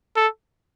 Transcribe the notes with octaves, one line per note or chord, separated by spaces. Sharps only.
A4